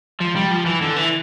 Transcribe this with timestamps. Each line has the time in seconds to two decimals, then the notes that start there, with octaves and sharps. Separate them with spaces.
0.20 F3
0.36 G3
0.51 F3
0.66 E3
0.81 D3
0.96 E3